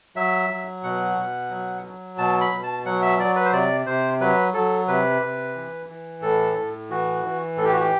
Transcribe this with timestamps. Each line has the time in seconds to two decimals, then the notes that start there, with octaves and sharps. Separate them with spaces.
0.16 F#3 E5
0.49 F#3
0.84 B2 F#5
1.18 B2
1.50 F#3
1.84 F#3
2.18 B2 A5
2.41 B5
2.52 B2
2.63 A5
2.86 F#3 F#5
3.03 E5
3.19 F#3 D5
3.36 B4
3.45 C5
3.53 C3 D5
3.86 C3 C5
4.21 F#3 B4
4.54 F#3 A4
4.88 C3 B4
5.22 C3
5.55 E3
5.89 E3
6.22 A2 A4
6.57 A2
6.90 E3 F#4
7.25 E3
7.57 A2 A4
7.65 G4
7.73 F#4
7.80 G4